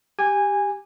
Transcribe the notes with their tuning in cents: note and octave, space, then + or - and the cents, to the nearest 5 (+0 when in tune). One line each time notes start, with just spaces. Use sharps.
G4 +0 G#5 -15